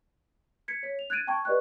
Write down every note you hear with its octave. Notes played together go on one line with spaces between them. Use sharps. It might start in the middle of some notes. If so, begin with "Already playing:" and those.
G#6 B6 C#7
C#5 B6
F7
F#6 G#6 A6 D7 D#7
G5 A5 C#6 G#6
G4 B4 D5 D#5 C#6 F#6